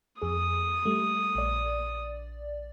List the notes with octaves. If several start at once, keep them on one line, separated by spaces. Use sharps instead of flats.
F2 G#4 D#6
G3 A3
A#1 D5